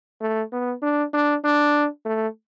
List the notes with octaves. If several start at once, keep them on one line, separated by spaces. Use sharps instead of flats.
A3
B3
D4
D4
D4
A3